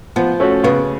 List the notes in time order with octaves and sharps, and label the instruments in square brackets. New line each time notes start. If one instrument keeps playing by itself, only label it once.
[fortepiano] F3 [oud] B3
[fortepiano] A3 C#4 F#4
[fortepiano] C#3 [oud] B3